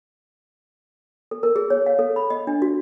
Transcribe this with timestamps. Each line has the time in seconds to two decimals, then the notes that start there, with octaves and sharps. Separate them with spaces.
1.31 A4
1.43 A#4
1.56 G#4
1.70 C#5
1.86 F5
1.99 A4
2.16 B5
2.30 D#5
2.47 D4
2.62 F#4